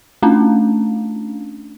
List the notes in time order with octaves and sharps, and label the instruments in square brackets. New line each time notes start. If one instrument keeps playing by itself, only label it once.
[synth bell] A3 C#4 D4